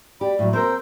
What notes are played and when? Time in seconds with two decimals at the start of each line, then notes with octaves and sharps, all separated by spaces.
0.21 G4 D5 B5
0.39 A2 F#3
0.53 C4 A#4 C6 E6 G6